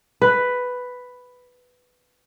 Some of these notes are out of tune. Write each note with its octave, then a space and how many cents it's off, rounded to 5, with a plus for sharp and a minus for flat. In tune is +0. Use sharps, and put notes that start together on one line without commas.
B4 +5